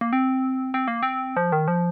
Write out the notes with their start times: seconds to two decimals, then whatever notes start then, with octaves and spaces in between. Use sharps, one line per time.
0.01 A#3
0.13 C4
0.74 C4
0.88 A#3
1.03 C4
1.37 F3
1.52 D#3
1.68 F3